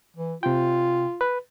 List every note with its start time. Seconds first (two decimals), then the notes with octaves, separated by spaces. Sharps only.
0.17 E3
0.43 C3 F4 G5
1.21 B4